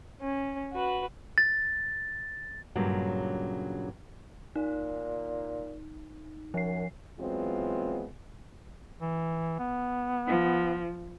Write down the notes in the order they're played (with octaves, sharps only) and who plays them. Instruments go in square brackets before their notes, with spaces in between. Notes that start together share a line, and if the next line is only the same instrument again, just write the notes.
[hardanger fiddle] C#4
F#4 B4
[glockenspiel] A6
[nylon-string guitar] G2 A#2 C#3 F#3
[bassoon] A#2 [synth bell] D#4
[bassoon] F#2 [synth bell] F3 C7
[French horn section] E3 F#3 G#3 B3 C4 F4
[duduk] E3
B3
[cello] F3